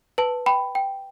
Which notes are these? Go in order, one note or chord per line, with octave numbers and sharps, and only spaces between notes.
B4 A5
G5 B5
G5